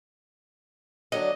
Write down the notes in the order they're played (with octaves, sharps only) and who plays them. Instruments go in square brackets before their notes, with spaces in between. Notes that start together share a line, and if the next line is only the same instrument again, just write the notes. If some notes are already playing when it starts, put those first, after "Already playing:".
[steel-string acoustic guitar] D3 F#3 D4 [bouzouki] D#5